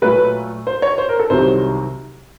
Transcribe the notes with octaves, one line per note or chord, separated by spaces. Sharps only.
A#2 F#3 A3 B4
C5
C#5
C5
A#4
A4
C2 C3 D#3 F#3 C5